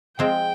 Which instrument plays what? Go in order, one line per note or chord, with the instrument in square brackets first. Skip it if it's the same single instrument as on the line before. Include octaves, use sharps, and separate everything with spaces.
[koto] F3 G#3 C4 [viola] G5